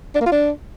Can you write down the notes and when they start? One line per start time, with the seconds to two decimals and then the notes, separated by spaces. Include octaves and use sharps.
0.15 D4
0.21 A#3
0.26 F4
0.32 D4